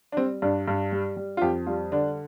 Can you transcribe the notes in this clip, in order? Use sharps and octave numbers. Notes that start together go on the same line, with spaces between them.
D4
G3 C4
G2 D4
G2
G3
G3
F4
F2 G4
G3 F4
D3 D4